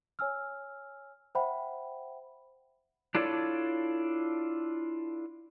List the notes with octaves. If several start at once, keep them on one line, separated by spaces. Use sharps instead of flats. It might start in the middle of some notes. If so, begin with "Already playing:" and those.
C#5 G#5 E6 F6
C5 E5 F#5 G5 B5
D4 E4 F4 A4 C#5 D5